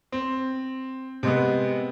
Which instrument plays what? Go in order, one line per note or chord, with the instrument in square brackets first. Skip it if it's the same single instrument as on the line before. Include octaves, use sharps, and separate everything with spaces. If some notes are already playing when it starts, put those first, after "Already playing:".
[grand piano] C4
C3 G#3 B3